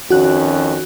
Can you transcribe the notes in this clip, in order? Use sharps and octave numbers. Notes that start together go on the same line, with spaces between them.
F2 D#3 C#4 F#4 F#6